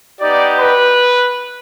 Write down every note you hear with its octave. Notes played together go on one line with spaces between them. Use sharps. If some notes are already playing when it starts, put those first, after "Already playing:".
B3 D#4 G4 D5
B4